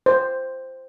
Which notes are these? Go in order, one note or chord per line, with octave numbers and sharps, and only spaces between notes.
C5